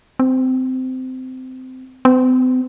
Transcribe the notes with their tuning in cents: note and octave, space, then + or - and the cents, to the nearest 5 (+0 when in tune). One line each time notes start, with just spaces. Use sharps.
C4 -20
C4 -45